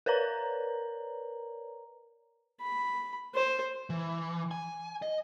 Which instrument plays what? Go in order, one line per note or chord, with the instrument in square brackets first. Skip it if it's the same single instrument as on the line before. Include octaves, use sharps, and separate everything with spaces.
[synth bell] A#4 B4 C#5 D5 A#5
[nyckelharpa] B5
C5
[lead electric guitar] E3
G#5
D#5